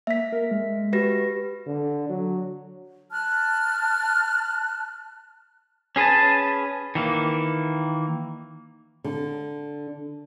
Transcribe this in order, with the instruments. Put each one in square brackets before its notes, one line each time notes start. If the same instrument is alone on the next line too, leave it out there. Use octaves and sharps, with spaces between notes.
[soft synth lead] A#3 [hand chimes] E5 B6
[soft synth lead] A#4
G#3
[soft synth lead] F#4 [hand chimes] G4 B4 A#6
[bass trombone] D3
F#3
[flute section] A5 F6 F#6
[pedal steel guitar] C#4 G#4 B4 G#5 A5
D#3 E3 A#3
[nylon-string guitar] D3